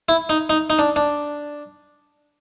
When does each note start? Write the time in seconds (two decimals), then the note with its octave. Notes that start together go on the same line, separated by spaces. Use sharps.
0.09 E4
0.29 D#4
0.50 D#4
0.70 D#4
0.79 D4
0.96 D4